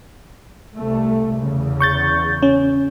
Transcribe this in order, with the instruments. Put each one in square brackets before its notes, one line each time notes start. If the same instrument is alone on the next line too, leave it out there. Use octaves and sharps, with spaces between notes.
[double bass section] C2 A3
E2 C#3
[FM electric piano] C#6 G6 A6
C#4